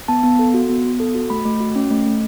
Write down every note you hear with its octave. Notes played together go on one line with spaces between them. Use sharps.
B3 A5
B3
A4
F#4
B3
B3
A4
F#4
A3 B5
A3
F#4
C#4
A3
A3